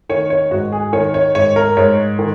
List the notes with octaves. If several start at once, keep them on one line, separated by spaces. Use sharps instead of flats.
D#3 C#5
C#5
G#2 F#4
G#4
D#3 C#5
C#5
G#2 C#5
A#4
G#2 C#5
D#3